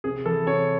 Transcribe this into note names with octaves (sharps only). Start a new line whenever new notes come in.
C3 G#4
E3 A4
C3 C#5